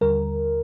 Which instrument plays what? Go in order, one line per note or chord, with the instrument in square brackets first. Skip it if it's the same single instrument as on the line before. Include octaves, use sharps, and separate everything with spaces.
[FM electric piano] D#2 D3 G3 A#4